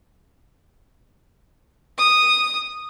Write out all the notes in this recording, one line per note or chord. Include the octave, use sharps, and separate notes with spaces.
D#6